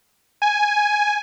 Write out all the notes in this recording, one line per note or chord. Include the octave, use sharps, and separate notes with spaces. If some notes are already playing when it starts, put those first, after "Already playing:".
G#5